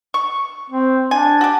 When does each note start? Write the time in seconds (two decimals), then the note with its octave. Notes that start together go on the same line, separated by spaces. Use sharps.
0.14 C#6
0.70 C4
1.11 D4 G#5
1.41 F#4 G4